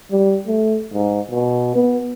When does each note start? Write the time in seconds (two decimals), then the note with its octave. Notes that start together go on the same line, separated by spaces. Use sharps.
0.11 G3
0.47 A3
0.94 G#2
1.30 B2
1.75 B3